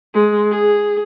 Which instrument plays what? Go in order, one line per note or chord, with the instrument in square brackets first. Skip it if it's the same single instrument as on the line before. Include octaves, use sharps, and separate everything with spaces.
[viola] G#3
G#4